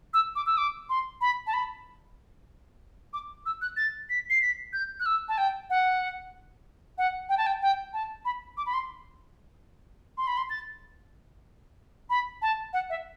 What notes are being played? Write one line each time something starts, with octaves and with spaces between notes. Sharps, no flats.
E6
D6
E6
D6
C6
B5
A5
B5
D6
E6
F#6
A6
B6
C7
B6
G6
F#6
E6
A5
G5
F#5
F#5
G5
A5
G5
G5
A5
B5
D6
B5
C6
C6
B5
C6
A6
B5
A5
F#5
E5